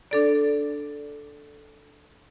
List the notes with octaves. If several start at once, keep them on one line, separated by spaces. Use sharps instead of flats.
D4 A4 D5